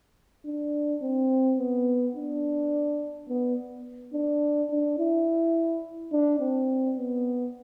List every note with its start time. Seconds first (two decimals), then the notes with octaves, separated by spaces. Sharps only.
0.46 D4
1.02 C4
1.58 B3
2.16 D4
3.29 B3
4.13 D4
4.70 D4
4.98 E4
6.12 D4
6.40 C4
6.97 B3